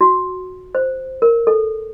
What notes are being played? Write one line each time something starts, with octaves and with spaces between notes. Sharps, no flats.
F#4
C5
A#4
A4